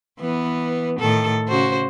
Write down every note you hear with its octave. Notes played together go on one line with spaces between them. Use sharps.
E3 B3
A2 D#3 A4
C#3 F#4 C5